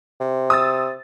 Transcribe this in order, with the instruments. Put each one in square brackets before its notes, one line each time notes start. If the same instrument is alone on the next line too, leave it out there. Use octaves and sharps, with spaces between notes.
[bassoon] C3
[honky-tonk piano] D#6 E6 A6